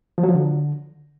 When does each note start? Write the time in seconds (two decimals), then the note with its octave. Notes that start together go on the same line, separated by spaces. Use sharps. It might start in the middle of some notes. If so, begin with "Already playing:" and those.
0.18 F3
0.23 F#3
0.29 F3
0.35 D3